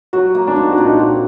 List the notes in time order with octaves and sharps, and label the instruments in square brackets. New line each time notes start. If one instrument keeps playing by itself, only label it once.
[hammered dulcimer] F#3 [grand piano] F#4
[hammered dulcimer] A#3
[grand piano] D4
[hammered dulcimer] C4 [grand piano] D#4
[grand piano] F#4
[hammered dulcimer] A#2 [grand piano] D4
[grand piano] D#4
[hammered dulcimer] C4 [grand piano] F#4